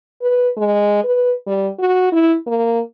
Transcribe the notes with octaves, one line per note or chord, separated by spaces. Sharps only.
B4
G#3
B4
G3
F#4
E4
A#3